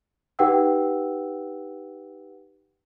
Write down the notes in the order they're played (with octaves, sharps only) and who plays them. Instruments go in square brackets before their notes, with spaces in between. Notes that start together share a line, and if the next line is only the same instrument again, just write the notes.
[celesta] D#4 G4 B4 F#5 G5 E6